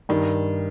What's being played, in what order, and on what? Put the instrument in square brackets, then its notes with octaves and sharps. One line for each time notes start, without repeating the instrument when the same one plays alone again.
[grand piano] G2 [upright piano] D#3